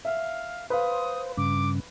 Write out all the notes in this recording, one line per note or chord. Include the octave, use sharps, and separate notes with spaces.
E5 F5
B4 C5 F5 D#6
G2 C#3 D6